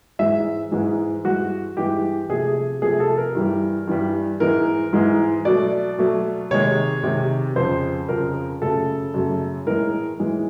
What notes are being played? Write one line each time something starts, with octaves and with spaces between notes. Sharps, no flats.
G#2 E3 G#3 E5
G#2 E3 G#3
G2 E3 G#3 F#4
G2 E3 G#3 G4
C3 F3 A3 G#4
C3 F3 A3 G#4
A4
A#4
G2 E3 G3
G2 E3 G3
G#2 E3 G#3 A#4
G#2 E3 G#3
B2 F#3 A3 D5
B2 F#3 A3
C3 D#3 G#3 C#5
C3 D#3 G#3
F2 C#3 F3 C5
F2 C#3 F3 A#4
F#2 C#3 F#3 A3 A4
F#2 C#3 F#3 A3
A2 E3 G#3 A#4
A2 E3 G#3